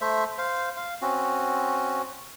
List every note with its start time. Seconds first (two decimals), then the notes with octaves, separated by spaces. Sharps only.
0.01 A3 C5 E5
0.38 C5 F5
0.77 F5
1.02 C4 C#4 F#4